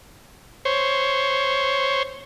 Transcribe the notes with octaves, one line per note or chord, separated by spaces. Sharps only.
C5 C#5